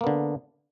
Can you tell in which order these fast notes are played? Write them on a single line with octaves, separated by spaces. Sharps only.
A#3 B3 D3